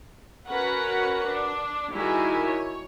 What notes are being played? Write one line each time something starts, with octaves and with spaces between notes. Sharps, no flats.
C#4 F#4 A#4 B4 F#5
D4
D#3 G3 E4 F#4 G#4 G#5
C#5